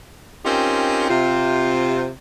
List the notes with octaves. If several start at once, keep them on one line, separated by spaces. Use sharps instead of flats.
C4 C#4 D#4 F4 G4 A#4
C3 F4